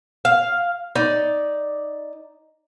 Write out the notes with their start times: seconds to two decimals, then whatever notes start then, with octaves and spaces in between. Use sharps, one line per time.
0.25 F5
0.95 D#4 D5